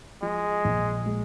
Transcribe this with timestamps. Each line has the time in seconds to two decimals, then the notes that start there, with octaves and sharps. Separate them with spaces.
0.22 F3 G#3
0.65 A#1
1.06 G#3